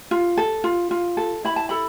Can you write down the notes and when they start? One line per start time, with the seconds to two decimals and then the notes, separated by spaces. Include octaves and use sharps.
0.11 F4
0.37 A4
0.64 F4
0.91 F4
1.17 A4
1.45 E4 B5
1.56 A5
1.69 A4 B5